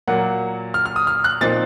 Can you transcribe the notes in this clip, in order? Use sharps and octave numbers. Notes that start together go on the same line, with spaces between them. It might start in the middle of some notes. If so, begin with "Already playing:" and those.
A#2 F#3 A#3 F#5
F6
F6
D#6
F6
F#6
A#2 F3 C4 D#4 A6